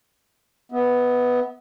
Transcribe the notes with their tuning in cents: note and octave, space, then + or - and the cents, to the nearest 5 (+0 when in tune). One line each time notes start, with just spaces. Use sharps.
B3 +0 E5 -40